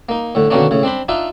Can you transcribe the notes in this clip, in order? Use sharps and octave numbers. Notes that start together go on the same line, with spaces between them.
A#3 D#4
A2 D3
B2 D3 D#3 A#3 C#4 D4
A2 C#3
C4 D4 C5 B5
D4 D#4 F4 E5